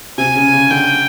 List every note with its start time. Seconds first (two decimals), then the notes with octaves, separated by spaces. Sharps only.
0.18 C3 G#5
0.35 C#3
0.53 C#3
0.71 D3 G5